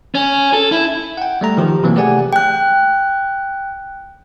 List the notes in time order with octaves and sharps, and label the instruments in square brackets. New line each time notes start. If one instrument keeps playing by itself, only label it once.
[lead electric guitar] C#4
A4
E4
[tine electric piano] F#5 G5
G3 A3 A#5
D#3 F3 G4
C3 E3 F#3 A#3
A3 G4 G#4 D5 F#5 G#5
[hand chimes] G5 F#6